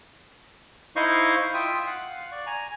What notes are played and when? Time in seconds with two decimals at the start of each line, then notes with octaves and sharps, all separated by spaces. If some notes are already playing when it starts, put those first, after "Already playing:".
0.96 D#4 E4 C5 D#5 F5 C#6
1.54 F4 E5 G5 D#6
1.86 F5 F#5
2.32 D5 C#6
2.47 G#5 A#5